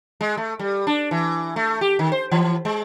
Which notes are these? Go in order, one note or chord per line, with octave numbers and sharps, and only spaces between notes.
G#3
A3
G3
D4
E3
A3
G4
D#3
C5
E3
G#3